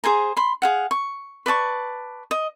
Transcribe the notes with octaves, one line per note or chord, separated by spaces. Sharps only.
G#4 C5 G#5 A#5
B5 C6
G#4 F5 F#5
C#6
B4 D5 A5 C#6
D#5